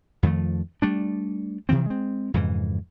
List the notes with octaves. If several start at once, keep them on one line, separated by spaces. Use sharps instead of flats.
F2 D#3 F3 A3
G3 A3 D4
C3 E3 F3 C4
G#3 C4
F2 G#2 C#3 E3